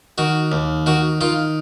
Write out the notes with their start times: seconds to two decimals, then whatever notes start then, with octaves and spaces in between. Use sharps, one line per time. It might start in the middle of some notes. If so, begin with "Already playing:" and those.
0.18 D#3 F#4
0.52 D#2
0.86 D#3 F#4
1.21 D#3 F4